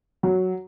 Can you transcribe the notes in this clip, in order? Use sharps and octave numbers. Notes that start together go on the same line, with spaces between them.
F#3